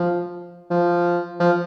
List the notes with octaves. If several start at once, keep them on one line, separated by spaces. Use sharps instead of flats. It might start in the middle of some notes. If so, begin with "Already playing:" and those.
Already playing: F3
F3
F3